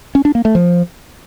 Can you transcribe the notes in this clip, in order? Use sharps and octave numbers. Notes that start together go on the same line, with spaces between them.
C#4
D4
A#3
A3
F3